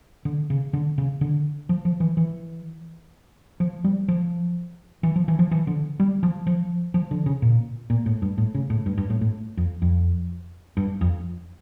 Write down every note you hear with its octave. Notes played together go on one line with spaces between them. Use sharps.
D3
C#3
D3
C#3
D3
F3
F3
E3
E3
F3
G3
F3
E3
F3
E3
F3
E3
D3
G3
F3
F3
F3
D3
C#3
A#2
A#2
A2
G2
A2
C#3
A2
G2
G2
A2
A2
F2
F2
G2
F2